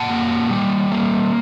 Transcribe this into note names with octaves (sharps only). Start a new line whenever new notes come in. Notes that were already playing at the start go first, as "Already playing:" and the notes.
Already playing: A#2 F#5 A5
A#3
G3
A#3